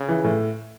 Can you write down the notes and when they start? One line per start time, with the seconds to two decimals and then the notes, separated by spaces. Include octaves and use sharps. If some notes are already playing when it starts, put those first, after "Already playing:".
Already playing: C#3
0.09 E3
0.24 A2